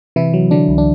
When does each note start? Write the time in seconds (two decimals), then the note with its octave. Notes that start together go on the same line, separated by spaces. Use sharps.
0.16 C3 E3 E4
0.34 F#3
0.51 D3 F#3 D4
0.68 C2
0.78 D4